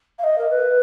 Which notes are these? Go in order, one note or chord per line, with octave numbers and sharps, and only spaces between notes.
F5
D#5
A#4
B4